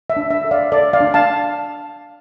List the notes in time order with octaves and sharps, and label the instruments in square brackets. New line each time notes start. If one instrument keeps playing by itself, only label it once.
[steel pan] E5
D4
E5
A4
D5 F5
A4 D5
D5 F5
D4
F5 A5